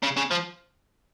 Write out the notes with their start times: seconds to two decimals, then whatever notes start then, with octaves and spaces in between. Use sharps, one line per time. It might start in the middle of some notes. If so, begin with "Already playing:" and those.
0.03 C#3
0.17 C#3
0.31 F3